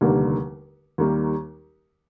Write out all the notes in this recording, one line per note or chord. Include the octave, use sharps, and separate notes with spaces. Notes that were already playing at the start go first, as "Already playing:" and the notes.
F1 D#2 D3 G3 A#3
D#2 D#3 G3 A#3